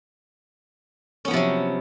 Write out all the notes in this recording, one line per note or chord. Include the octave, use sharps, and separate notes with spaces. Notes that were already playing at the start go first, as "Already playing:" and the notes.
C3 F3 F#3 B3 C#4